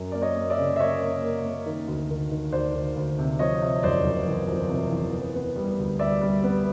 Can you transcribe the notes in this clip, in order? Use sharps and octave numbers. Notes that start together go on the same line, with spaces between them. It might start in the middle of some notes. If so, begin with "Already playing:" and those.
Already playing: F#2
A#3 D5
C#5 D#5
A#3
D5 E5
C#3
E5
A#3 C#5 D#5
A#3
A#3
A#3
D#3
D2
D#3
D#3
D2 C5 D5
D#3
D2
C3
F3 C#5 D#5
C3
F#1 C5 D5
F#1
E2
F3
C3
E2
B3
B3
G3
D2
G3 D5 E5
G3
B3